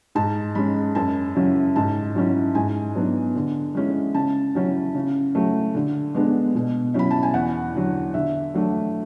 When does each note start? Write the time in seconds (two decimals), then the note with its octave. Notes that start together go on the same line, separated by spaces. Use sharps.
0.15 G#2 A5
0.55 G#3 C#4 B5
0.95 F#2 A5
1.35 C#3 F#3 C#4 E4
1.76 G#2 A5
2.15 F#3 C#4 E4
2.55 G#2 G#5
2.95 F#3 B3 D4
3.35 D3
3.75 G#3 C#4 E4
4.14 C#3 A5
4.55 F#3 C#4 E4
4.95 C#3
5.35 F#3 A3
5.75 D3
6.15 G#3 B3 D4
6.55 B2
6.94 F#3 C#4 E4 B5
7.11 A5
7.23 G#5
7.34 E2 F#5
7.74 D3 F#3
8.14 D3 E5
8.54 F#3 A3 D4